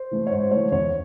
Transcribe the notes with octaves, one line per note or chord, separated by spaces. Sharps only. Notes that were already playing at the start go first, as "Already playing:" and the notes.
Already playing: C5
E3 A3
C#5
G#2 C5
E3 A3 C#5
E2 C#5